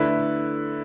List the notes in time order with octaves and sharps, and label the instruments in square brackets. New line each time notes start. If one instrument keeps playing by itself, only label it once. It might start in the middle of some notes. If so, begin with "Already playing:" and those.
Already playing: [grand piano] D3 A3 E4 B4